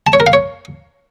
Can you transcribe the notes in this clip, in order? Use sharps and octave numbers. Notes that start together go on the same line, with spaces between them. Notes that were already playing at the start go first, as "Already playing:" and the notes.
A5
C#5
A#4
F5
C#5